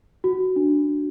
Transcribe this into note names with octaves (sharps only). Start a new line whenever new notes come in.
F#4
D4
D4